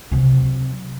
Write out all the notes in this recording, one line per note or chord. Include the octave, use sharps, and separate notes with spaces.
C3 F#3